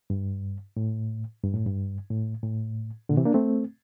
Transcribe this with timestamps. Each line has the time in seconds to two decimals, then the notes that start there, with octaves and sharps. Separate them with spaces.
0.10 G2
0.77 A2
1.43 G2
1.54 A2
1.66 G2
2.10 A2
2.43 A2
3.09 A#2 D3
3.17 C3 E3
3.25 A#3 D4
3.34 A3 C4